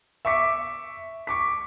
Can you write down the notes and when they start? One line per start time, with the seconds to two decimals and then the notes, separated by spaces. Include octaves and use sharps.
0.25 E5 C#6 D6 B6 C#7
1.27 C#6 D6 B6